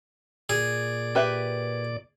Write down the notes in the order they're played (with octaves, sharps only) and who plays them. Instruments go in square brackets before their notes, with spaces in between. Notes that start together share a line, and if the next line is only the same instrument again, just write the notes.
[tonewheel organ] A#2 D5 [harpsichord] G#4
[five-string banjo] G4 B4 E5